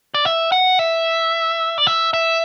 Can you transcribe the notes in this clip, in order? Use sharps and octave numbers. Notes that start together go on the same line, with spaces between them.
D5
E5
F#5
E5
D5
E5
E5